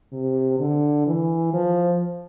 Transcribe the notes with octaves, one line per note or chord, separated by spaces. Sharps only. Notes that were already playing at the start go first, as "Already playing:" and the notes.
C3
D3
E3
F3